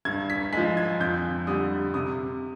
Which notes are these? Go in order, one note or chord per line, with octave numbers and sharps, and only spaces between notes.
G2 G#6
B6
F3 G#3 B6
G#6
F2 G6
D3 G3 D#6
C3 D#6